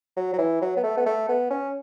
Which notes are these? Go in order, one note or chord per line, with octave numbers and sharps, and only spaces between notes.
F#3
F#3
E3
F#3
B3
A3
B3
A3
B3
C#4